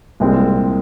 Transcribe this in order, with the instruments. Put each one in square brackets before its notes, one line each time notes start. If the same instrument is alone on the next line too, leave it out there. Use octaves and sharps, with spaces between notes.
[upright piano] C2 A#2 G#3 C4